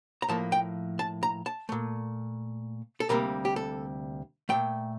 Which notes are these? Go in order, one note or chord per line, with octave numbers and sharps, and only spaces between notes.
A#5
A2 F3 A#3 A5
G5
A5
A#5
A5
A#2 A3
A4
D2 C3 G3 A#3 A#4
G4
A4
A#2 A3 G5